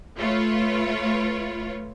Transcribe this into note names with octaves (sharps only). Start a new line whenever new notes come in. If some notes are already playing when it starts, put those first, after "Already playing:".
A3 F4 B4 C#5